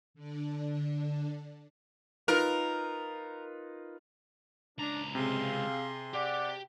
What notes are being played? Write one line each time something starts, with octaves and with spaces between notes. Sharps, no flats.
D3 D4
D#4 F4 A#4 B4
C#2 D4 A#5
C3 C4 G#4 F5 C6
G4 D5 F#5 D6